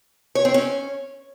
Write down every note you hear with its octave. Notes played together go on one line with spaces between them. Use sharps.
C#5
C4
C#4